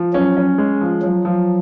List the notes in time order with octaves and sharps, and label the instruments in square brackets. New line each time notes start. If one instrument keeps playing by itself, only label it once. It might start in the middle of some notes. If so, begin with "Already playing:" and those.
Already playing: [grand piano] F3
[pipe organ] F#3 [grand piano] C#4
[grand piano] C#4
G#3
F3
[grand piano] F3 [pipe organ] F#3
[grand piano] F3